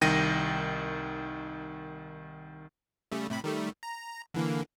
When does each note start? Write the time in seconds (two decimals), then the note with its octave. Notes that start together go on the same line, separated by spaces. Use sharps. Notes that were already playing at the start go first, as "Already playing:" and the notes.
0.01 C2 D#3 G5 A#6 D#7
3.12 C#3 G3 A3
3.30 A2 C3 B5
3.44 D#3 G3 A3
3.83 A#5
4.34 D3 E3 A#3